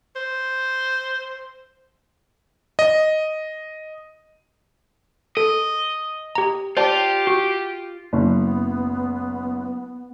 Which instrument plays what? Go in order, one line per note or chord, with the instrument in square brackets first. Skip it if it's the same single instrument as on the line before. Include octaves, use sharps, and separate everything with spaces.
[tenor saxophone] C5
[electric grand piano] D#5
[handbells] A4 [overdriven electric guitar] D#5
[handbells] G4 A#5
[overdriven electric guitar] F4 [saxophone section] G4 [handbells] C5 D5 A5
[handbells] F#4
[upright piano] F#1 [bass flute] B3